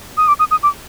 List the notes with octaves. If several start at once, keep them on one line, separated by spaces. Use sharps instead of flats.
D#6
D6
D#6
D#6
D6